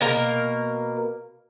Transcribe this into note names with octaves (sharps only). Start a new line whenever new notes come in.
B2 A#3 A#4